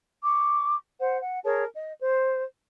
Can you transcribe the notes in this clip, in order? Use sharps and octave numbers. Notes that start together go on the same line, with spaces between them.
C#6 D6
C5 F#5
F#5
G#4 A#4 C#5 A5
D#5
C5